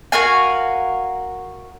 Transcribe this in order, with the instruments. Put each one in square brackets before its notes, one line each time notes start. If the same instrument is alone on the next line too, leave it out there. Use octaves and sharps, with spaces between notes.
[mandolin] F#4 A#4 F5 G#5